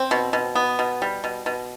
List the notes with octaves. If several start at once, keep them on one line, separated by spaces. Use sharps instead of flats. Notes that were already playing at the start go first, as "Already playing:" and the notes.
Already playing: C4
B2
B2
B3
B2
G3
B2
B2